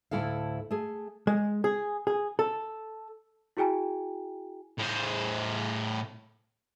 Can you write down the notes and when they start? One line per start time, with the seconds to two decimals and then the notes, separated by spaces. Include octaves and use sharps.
0.11 D2 A2 F#3 E4 A4 F5
0.71 A3 G#4
1.27 G#3
1.64 G#4
2.07 G#4
2.39 A4
3.57 E4 F#4 G#4 G5 G#5 A#5
4.79 A2 C5